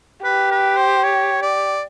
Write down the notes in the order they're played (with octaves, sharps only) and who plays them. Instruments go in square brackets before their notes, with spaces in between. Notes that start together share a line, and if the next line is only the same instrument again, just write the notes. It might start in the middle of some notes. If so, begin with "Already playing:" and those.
[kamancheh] G4 [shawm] B4
[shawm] B4
C5
C#5
D5